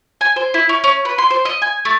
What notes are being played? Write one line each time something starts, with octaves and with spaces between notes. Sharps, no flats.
G#5
C5
E4
C#4
C#4
B4
C6
C5
D#5
G#5
A3